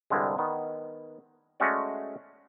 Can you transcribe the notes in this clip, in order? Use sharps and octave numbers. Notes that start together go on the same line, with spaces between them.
C2 G2 D3 G3 G#3
D#3 B3
G#3 A3 C#4 F#4 C#5 D5